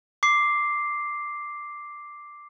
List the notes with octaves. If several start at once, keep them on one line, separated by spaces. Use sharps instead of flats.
D6 C7